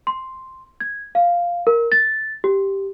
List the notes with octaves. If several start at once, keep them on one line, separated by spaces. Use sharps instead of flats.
C6
G#6
F5
A#4
A6
G4